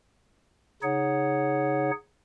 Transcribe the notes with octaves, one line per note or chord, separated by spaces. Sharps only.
C#3 D#4 G#4 C#5 F#5